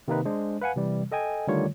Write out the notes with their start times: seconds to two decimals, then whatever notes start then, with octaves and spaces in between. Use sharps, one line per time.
0.08 C3 D#3 A#3 C4 D#4 B4
0.25 G#3 D4 C5
0.61 B4 F5 F#5 G#5
0.76 C3 E3 G3
1.12 A4 D#5 G5 G#5
1.48 D3 D#3 G3 A3 F4 C#5